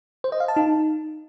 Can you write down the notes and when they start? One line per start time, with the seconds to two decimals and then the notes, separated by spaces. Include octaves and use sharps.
0.24 C5
0.32 D#5
0.40 F5
0.48 A5
0.56 D#4